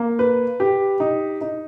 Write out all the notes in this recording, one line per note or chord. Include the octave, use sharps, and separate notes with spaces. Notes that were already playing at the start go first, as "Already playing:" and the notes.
Already playing: A#3
B4
G4
D#4
D#4